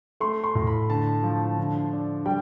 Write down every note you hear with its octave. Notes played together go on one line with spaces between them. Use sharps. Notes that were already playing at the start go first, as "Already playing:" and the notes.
A3 C6
C6
A2
B5
D3 A5
F3
D3
D4
G3 G5